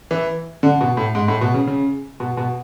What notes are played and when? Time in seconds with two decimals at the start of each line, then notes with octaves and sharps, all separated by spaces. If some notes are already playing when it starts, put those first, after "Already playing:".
0.11 E3
0.63 D3
0.81 B2
0.97 A2
1.15 G#2
1.28 A2
1.41 B2
1.54 C#3
1.67 C#3
2.20 B2
2.37 B2